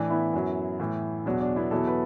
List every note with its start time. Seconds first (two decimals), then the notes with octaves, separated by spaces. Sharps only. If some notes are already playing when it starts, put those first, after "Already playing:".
Already playing: A2 E3 D4
0.10 B3 E4
0.33 F#2 F#3
0.79 A2 E3
1.25 E2 B2 F#3 D4
1.40 D4
1.56 B3 E4
1.71 E2 B2 F#3 E4 A4
1.87 B4